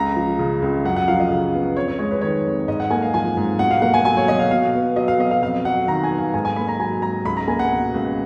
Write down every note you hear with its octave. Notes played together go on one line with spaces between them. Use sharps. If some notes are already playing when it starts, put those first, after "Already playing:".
Already playing: C#2 A#5
F3
C#3
C#2
F#2 F#5
F#5
F3 F5
D#5
C#3
B3
F2 C#5
C#5
G#3 C#5
B4
D#3 C#5
F2
G#2 D#5
F#5
A#3 G#5
F5
F3 G#5
G#2
B2 F#5
F5
A#3 F#5
G#5
F#3 G#5
C#5
B2 D#5
F5
B2 F5
B3
F#3 D#5
F5
B2 D#5
F5
F2 F5
F#3 F#5
D#3 A#5
G#5
B3
F5
G#2 G#5
G#5
A#3 B5
A#5
F#3 G#5
G#2 A#5
C#2 B5
A#5
A#3 G#5
F#5
B2
C#2